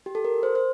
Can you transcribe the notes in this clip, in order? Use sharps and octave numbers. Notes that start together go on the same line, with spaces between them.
G4
A4
A#4
C5
C5